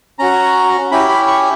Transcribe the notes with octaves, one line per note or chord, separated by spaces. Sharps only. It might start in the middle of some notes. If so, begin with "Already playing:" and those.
C#4 F#4 A#5
C#4 E4 G4 B5
B5
C#6